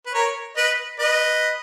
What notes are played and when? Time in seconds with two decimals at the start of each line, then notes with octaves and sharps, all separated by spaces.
0.06 B4
0.14 A#4 C#5
0.56 B4 D#5
0.99 B4 D#5